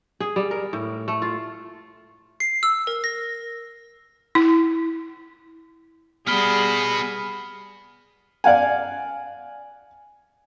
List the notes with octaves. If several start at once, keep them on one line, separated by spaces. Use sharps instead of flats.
G#4
G3
A#4
A2
A3
F4
C7
E6
A#4
A#6
E4
B2 G3 B3 G#4 B5 F6 B6 G7
D5 F5 F#5 G#5